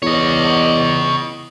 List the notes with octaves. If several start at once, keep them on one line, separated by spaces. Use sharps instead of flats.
E2 C#5 D#5